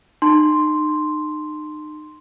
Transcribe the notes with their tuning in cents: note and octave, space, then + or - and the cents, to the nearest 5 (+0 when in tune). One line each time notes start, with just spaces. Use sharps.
D#4 -35 A5 +0 C6 +0